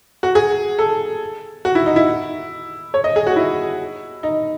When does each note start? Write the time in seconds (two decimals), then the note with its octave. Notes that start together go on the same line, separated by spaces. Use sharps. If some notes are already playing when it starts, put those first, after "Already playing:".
0.23 F#4
0.35 G#4
0.79 A4
1.65 F#4
1.75 E4
1.86 D#4
1.96 E4
2.94 C#5
3.04 D#5
3.16 G#4
3.27 F#4
3.36 E4
4.23 D#4